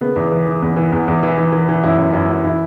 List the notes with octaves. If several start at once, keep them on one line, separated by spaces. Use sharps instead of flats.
C#3 B3
E2
E3
E3
E2
E3
E2
E2
E3
E3
E3
E3
F#2 E4
F#2
F#2 E4
F#2
E3 E4